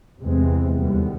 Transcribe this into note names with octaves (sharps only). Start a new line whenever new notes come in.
E2 C3 E3 G#3 C4
D#2 D3 G3 B3